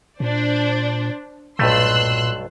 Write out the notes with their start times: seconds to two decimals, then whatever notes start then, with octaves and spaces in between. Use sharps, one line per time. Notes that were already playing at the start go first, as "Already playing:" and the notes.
0.20 A#2 D4 C5 D5
1.59 B1 G2 A#2 A3 C6 E6 F#6